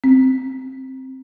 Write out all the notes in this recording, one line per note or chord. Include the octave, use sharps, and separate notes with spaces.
C4